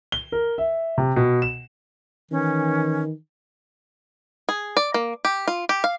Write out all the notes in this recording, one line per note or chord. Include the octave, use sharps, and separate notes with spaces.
G7
A#4
E5
C3
B2
E7
D#3 E3 C#4
G#4
D5
A#3
G4
F4
G4
F5